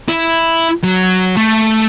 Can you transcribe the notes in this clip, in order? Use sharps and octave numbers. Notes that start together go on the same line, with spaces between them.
E4
F#3
A3